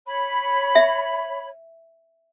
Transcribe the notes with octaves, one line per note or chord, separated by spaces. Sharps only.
C#5 B5
E5